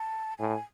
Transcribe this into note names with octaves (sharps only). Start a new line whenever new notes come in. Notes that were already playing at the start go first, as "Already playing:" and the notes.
Already playing: A5
A2 G#5